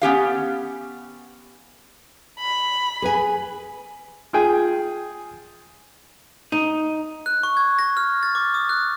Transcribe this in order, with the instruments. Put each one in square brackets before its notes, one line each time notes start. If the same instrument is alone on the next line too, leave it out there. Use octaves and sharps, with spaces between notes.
[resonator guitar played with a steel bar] B3 C#4 G4 F5
[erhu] B5
[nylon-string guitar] G#4 B4 G#5
[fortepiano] F4 G#4 G5 G#5
[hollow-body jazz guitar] D#4
[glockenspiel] F#6
C#6
G#6
A#6
F6
A6
D6
D#6
F#6